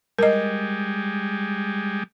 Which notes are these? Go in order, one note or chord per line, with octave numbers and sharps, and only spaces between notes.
G3 G#3 A#4 D#5